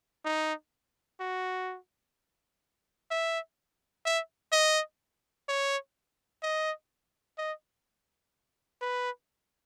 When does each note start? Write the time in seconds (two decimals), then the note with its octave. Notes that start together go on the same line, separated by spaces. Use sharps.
0.25 D#4
1.20 F#4
3.11 E5
4.05 E5
4.52 D#5
5.49 C#5
6.43 D#5
7.38 D#5
8.82 B4